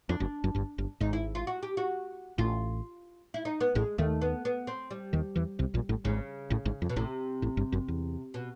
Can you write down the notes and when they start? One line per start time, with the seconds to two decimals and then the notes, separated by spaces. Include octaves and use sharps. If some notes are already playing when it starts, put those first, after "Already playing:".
0.09 F2 D4
0.20 F#1 F#2
0.44 F#1 F#2
0.55 G1 G2
0.78 G1 G2
1.00 G#1 G#2 D#4
1.13 E4
1.35 F4
1.47 F#4
1.63 G4
1.77 F#4
2.38 A1 A2 F4
3.34 E4
3.45 D#4
3.60 B3
3.75 A1 A2 G#3
3.98 D#2 D#3 A3
4.22 B3
4.45 B3
4.67 C4
4.91 G3
5.13 D#2 D#3
5.36 E2 E3
5.59 C2 C3
5.74 A#1 A#2
5.89 A1 A2
6.05 G#1 G#2 C#3
6.50 A1 A2
6.65 G#1 G#2
6.82 F2
6.89 B2
6.96 A1 A2 C3
7.42 A1 A2
7.57 G1 G2
7.72 F#1 F#2
7.88 E2
8.34 B2